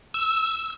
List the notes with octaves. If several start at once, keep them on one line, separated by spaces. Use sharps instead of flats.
E6